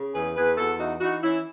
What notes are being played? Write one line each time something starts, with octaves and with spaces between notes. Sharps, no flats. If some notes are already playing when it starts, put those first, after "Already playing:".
Already playing: C#3
E2 G#4 B4
E2 G#4 B4
E2 F#4 A4
E3 D#4 F#4
E3 D#4 F#4
E3 C#4 E4